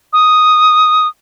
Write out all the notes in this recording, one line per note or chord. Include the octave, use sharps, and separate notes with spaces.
D#6